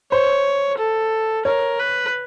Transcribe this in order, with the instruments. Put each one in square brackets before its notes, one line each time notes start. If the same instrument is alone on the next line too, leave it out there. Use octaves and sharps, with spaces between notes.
[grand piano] C5 [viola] C#5
[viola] A4
[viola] A#4 [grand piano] C#5
[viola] B4